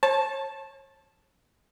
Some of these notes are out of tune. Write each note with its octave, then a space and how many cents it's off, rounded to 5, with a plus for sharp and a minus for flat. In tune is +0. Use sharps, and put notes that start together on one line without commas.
C#5 -40 A5 -5